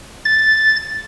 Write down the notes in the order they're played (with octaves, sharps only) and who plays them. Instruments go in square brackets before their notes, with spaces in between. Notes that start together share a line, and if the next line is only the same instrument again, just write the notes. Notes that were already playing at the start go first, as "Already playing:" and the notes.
[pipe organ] A6